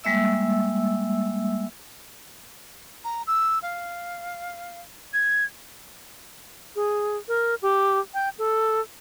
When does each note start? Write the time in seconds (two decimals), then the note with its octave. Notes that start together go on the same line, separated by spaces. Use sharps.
0.04 G3 G#3 A#3 E5 E6
3.04 A#5
3.27 E6
3.62 F5
5.13 G#6
6.76 G#4
7.28 A#4
7.62 G4
8.14 G5
8.39 A4